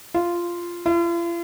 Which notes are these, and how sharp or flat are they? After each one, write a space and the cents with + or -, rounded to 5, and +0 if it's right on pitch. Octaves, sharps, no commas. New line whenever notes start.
F4 -10
F4 -45